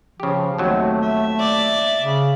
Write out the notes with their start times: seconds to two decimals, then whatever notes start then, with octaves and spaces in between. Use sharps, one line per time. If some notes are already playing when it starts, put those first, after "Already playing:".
0.20 C#3 F3 G4
0.58 D#2 F#3 A3 C4 F#5
1.03 E5
1.40 D5
1.99 C#3